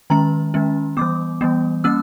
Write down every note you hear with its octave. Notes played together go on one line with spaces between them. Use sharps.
D#3 G#3 C#4 A#5
D#3 G#3 C#4
E3 G3 B3 D6
E3 G3 B3
G3 A#3 C#4 E6